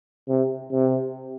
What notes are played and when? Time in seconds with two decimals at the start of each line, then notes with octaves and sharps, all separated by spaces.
0.29 C3
0.72 C3